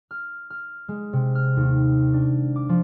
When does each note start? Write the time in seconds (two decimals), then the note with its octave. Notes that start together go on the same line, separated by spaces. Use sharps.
0.11 F6
0.50 F6
0.88 G#3
1.13 C3
1.35 F6
1.57 D#2
2.13 D4
2.56 D6
2.69 F3